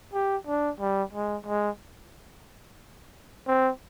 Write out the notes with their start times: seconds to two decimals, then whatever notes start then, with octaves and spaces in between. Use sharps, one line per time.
0.14 G4
0.47 D4
0.80 G3
1.13 G#3
1.46 G#3
3.47 C4